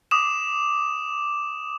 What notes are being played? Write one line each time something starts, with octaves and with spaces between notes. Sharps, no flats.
D6 D#6 E7